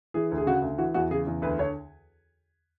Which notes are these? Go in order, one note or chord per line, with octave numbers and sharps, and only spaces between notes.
E3 G#4
D2
G#4
C#3 F#4
D2
E3 F#4
E2 F#4
C#3 G#4
E2
D2 B4
D3 C#5